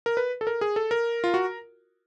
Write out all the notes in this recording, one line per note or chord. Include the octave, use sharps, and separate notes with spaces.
A#4
B4
A4
A#4
G#4
A4
A#4
F4
F#4